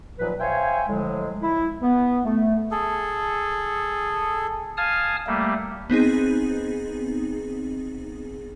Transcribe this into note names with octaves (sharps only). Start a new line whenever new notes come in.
D#2 A#2 F3 F#3 B4
C5 C#5 E5 F5 G5 G#5
A2 D3 F3 F#3 G#3
E4
B3
A3
G#4 A4
F5 G#5 A5 D#6 F6
G3 A3 A#3
B3 C4 D#4 G#4